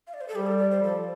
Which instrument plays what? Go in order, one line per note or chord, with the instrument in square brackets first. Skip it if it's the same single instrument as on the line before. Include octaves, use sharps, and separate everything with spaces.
[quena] F5
D5
C5
A4
[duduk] G3 [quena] G4
[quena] A4
D5
C5
[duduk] F3 [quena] A4
[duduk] F3